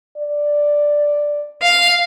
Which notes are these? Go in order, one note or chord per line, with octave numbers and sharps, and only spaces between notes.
D5
F5